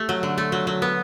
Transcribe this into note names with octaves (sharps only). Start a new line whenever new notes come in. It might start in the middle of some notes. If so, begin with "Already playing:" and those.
Already playing: A3 G4
F#3
D3
A3
F#3
F#3
B3